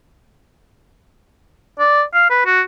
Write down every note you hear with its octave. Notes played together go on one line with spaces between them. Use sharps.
D5
F5
B4
F#4